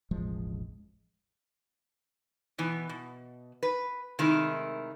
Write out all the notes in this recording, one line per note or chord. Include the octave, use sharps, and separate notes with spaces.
E1 A1 F3 G#3
B2 E3 B3
B2
B4
C3 D#3 G#3 A3 E4 A#4